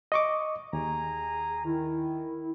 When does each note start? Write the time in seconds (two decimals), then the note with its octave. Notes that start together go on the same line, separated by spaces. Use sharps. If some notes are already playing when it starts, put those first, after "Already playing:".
0.12 D#5 C#6 D6
0.73 D#2 G#4 G#5 A#5
1.65 D#3 E4